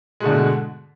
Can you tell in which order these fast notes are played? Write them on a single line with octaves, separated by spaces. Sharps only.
G#3 A3 D3 G#2 B2